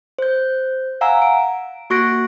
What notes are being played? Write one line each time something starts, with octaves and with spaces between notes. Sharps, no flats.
C5 G6
F5 F#5 G#5 A#5 E6
D7
A#3 F#4 C#6 F#6 A#6 D7